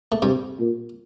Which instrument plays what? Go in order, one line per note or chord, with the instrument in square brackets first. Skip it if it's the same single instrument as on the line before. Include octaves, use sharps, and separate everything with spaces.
[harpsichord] A3
[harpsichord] G2 G3 [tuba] C3
[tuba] A#2